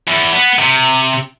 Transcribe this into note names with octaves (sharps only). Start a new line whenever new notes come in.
E2
B3
C3